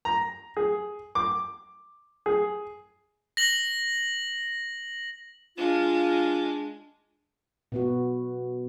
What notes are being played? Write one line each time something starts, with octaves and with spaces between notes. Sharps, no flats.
A#5
G#4
D6
G#4
A#6 F#7
G#3 D4 F4
B2 B3 F#4